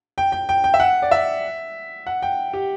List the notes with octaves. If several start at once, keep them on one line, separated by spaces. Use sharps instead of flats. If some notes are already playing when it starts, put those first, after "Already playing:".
G5
G5
G5
G5
E5
F#5
D5
E5
F#5
G5
G4